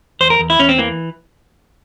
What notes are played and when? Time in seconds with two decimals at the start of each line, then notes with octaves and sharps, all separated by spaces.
0.20 E2 C5
0.30 A#4
0.39 E2
0.50 E4
0.59 E2 C#4
0.69 C4
0.78 E3 A#3